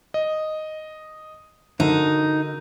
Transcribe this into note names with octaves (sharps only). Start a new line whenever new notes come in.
D#5
D3 D#4 F#4 A#4